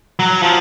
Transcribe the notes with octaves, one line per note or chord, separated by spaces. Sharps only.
F#3
F3